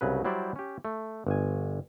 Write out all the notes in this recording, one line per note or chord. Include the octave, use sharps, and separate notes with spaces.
C2 C#3 F#3 B4
F#3 G3 E4 C5 D5
C#4 G4
A3
G1 G#5